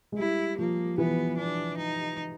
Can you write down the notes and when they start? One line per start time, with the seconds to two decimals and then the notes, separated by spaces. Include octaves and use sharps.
0.12 G#3
0.19 G3 E4
0.58 F3 A#3
0.98 E3 B3
1.38 D4
1.77 D#4